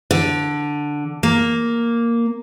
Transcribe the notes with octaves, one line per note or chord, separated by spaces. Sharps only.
D3
A#3